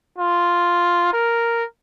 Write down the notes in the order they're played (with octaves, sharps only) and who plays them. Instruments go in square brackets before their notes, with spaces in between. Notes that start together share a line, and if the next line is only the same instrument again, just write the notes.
[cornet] F4
A#4